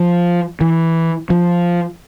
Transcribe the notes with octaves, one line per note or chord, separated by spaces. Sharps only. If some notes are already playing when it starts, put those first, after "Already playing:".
Already playing: F3
E3
F3